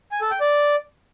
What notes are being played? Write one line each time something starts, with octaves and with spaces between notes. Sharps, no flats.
G#5
A4
G5
D5